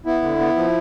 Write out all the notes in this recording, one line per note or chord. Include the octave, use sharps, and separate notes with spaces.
B3 E4
D3
B3
F3